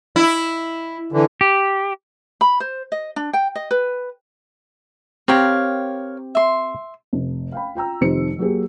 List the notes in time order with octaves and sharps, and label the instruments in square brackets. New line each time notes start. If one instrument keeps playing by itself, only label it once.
[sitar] E4
[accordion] D3 E3
[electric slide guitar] G4
[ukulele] B5
C5
D#5
D4
G5
D#5
B4
[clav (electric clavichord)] C4 G4 [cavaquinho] A#4 C#5 F5
[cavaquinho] E5 C6
[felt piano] F1
F5 G5 B5
F4 G5 A#5 E6
F1 F2 D#3 G4 C5 C#7
F#3 A#3 G4 G#4